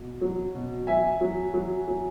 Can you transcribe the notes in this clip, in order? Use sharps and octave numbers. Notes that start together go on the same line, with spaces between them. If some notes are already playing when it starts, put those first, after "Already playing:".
Already playing: B2
F#3
B2
F#3 E5 G#5
F#3
F#3
F#3